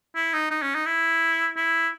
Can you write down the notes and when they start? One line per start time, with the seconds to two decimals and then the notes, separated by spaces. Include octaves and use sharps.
0.15 E4
0.33 D#4
0.51 D#4
0.62 C#4
0.75 D#4
0.86 E4
1.57 E4